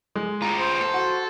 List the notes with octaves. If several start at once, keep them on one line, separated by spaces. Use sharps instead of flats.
G#3
F4 G#4 A#5
C5
A4
F#4